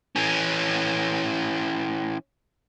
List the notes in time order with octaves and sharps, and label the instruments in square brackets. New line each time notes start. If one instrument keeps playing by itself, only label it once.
[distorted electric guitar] E3 C#4